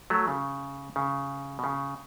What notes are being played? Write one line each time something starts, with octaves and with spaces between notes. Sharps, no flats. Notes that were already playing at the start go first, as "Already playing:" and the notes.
F#3 A3
C#3
C#3
B2
C#3